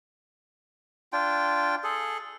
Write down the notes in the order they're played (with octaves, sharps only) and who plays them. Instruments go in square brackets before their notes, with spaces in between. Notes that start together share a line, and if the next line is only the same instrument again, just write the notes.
[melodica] D4 F4 G5
G#4 A4